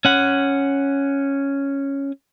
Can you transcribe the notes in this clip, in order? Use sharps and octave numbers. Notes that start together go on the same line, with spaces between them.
C#4 F#5